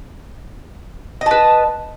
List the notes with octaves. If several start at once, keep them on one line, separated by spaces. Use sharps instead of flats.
B4 D#5 A5